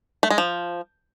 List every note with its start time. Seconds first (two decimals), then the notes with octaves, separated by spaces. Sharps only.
0.23 A3
0.30 G#3
0.38 F3